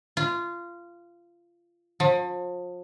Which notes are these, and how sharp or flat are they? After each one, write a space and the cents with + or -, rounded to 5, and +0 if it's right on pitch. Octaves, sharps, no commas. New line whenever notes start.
F4 -20
F3 +35